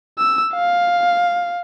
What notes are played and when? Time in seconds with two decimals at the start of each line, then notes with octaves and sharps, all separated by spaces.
0.18 E6
0.54 F5